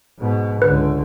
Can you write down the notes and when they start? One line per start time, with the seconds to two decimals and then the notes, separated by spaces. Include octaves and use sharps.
0.19 G#2 B2
0.62 C#2 D3 B4